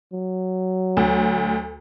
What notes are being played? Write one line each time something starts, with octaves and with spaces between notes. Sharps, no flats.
F#3
D2